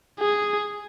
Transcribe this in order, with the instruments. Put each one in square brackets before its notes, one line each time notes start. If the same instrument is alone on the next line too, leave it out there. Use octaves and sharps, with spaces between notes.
[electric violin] G#4